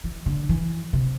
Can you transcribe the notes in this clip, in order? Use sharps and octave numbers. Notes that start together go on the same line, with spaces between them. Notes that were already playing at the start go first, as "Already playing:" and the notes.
E3
D3
E3
C3